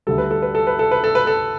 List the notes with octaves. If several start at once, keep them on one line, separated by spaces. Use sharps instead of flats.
D2 D3 G3 A4
B4
A4
B4
A4
B4
A4
B4
A4
B4
A4